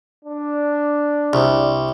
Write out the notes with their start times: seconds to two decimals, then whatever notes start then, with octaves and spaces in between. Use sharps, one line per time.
0.25 D4
1.33 C2